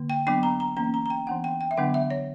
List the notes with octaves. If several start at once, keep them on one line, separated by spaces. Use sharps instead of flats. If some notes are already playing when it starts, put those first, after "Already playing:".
Already playing: D3 A#3
G5
F#3 B3 D4 G5
A#5
A#5
E3 A#3 C#4 A#5
A#5
A#5
G5
E3 B3 D4 F#5
G5
G5
E5
D3 F#3 B3 D4 F#5
E5
C#5